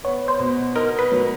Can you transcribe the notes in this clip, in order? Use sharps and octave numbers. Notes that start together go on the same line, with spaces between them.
B3 C#5
C5
B2
D#4 A#4
B4
F#3